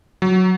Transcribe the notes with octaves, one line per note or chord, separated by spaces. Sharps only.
F#3